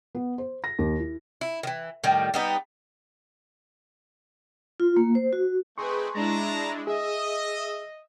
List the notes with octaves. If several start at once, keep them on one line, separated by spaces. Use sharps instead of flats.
B3
C5
A#6
D#2
E4
E4
D#3 E3
A2 D#3 G3
G3 B3 D#4
F4
A#3
C5
F#4
A3 C4 D#4 G#4 B4 C6 C#6
G#3 D4 E4 A5 A#5
G#4 D#5 E5